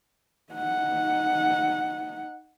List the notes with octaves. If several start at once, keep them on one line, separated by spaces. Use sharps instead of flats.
D#4 F#5